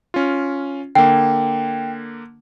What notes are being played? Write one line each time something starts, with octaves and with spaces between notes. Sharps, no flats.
C#4 F4
D3 A#3 G5